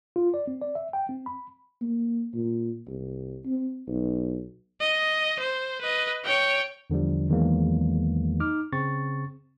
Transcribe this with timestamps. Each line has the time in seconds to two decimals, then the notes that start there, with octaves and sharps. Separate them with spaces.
0.16 F4
0.34 D5
0.47 C4
0.61 D5
0.75 E5
0.93 G5
1.09 C4
1.26 B5
1.81 A#3
2.34 A#2
2.87 C2
3.46 C4
3.88 B1
4.81 D#5
5.39 C5
5.81 B4 D#5
6.24 C#5 G5
6.90 E2 D3 F3 G3
7.29 E2 D#3 E3 F#3 G#3 A#3
8.40 D#4 D6 F6
8.73 C#3 C4 C#6 A6